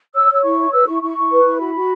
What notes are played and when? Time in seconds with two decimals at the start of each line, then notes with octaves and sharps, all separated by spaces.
0.15 C#5 E6
0.30 C#5 E6
0.44 E4 C#6
0.59 C#5
0.72 B4 E6
0.87 E4 C#6
1.02 E4 C#6
1.17 E4
1.31 B4
1.45 E4
1.59 F#4 B5
1.74 F#4